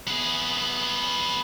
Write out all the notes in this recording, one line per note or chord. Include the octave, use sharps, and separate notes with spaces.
B3 G#4